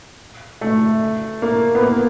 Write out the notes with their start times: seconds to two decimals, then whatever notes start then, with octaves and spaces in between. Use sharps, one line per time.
0.61 A3
1.42 A#3
1.75 B3
1.82 A#3